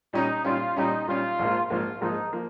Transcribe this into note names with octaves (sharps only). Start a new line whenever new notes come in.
A#2 G3 C#4 D#4
A#2 G3 C#4 F4
A#2 G3 C#4 D#4
A#2 G3 C#4 F4
A#1 G#2 F3 A#3
A#1 G#2 F3 A#3 F4
A#1 G#2 F3 A#3 D#4
F3 A#3